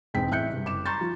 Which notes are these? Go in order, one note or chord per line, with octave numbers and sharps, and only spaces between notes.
E1 G#2 C4 G#4 G5 B6
A1 E5 F#6 G6 C#7
G2 C3
F#1 D6 E7
A#5 C6 C#6 G6 A6
F3